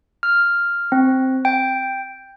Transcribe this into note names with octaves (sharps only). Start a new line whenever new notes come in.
F6
C4
G5